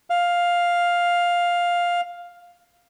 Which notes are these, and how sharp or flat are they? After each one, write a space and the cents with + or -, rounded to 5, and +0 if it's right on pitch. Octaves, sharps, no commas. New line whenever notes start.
F5 +5